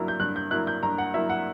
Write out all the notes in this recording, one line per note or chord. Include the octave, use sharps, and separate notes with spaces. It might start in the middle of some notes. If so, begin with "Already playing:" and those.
Already playing: G2 F#3 A#3 E4
G6
G2 F#6
G6
F#3 A#3 E4 F#6
G6
G2 A#5
F#5
F#3 A#3 E4 E5
F#5